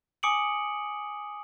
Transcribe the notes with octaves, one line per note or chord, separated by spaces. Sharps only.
G#5 D6 D#6 C#7 D7 F#7